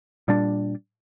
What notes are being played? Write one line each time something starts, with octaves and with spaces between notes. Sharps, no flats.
A#2 G3 D4